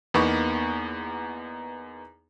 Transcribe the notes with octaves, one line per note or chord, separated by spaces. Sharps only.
E2 A#3 B3 D#4 B5 C#6